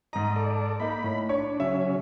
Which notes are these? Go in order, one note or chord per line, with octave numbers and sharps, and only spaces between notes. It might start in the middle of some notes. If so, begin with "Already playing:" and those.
G#2 D#5 A#5
A4 D5
A#3 D#4 B5
A2
D4 C#5
C#3 F#3 C#4 E5